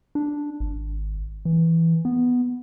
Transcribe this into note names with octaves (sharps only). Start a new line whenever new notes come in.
D4
G#1
E3
B3